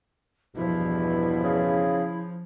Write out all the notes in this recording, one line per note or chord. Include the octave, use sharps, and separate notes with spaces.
E2 G2 B2 F3 E4
C#3